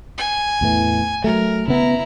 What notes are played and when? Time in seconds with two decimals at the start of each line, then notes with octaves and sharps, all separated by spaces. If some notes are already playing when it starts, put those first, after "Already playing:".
0.18 G#5
0.61 E2 A2 E3
1.24 F#3 A3 A#4
1.68 C#3 B3 E4 A#5